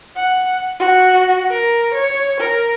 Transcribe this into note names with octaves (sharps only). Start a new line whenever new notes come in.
F#5
F#4
A#4
C#5
A#4